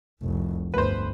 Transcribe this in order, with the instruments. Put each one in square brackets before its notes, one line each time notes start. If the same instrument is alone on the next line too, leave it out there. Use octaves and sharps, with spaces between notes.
[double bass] F1 C2
[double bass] G1 D2 [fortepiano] B4 C5